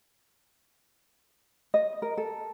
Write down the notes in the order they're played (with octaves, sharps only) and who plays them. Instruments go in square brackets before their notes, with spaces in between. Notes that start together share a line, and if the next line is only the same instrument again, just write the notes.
[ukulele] D#5
A#4
A4